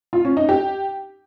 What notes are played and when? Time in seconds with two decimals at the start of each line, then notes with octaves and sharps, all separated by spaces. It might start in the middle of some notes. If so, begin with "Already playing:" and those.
0.13 F4
0.25 C#4
0.37 D#4
0.49 G4